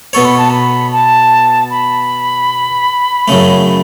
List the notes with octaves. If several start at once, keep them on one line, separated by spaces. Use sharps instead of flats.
B2 B3 A4 C#5 C#6
B5
A5
B5
A5
B5
F#2 C#3 A3